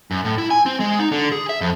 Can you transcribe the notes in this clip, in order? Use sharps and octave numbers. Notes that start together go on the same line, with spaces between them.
F#2
A2
E4
G#5
C4
G#3
D#4
D3
G#4
E5
F2